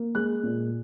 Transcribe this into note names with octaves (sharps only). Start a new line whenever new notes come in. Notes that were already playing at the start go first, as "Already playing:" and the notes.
Already playing: A#3
G#3 F#6
A#2